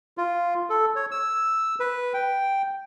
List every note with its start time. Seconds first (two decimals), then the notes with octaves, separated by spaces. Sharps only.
0.18 F4
0.70 A4
0.96 C#5
1.11 E6
1.80 B4
2.14 G5